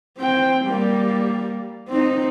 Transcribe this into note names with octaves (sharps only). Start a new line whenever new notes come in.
C4 G5
G3 A#3
C4 D#4